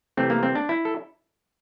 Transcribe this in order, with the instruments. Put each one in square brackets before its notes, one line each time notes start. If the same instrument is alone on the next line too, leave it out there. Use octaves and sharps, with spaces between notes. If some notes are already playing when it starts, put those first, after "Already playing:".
[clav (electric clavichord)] C3 E3 A3 C4
A#3
C4
D4
E4
A4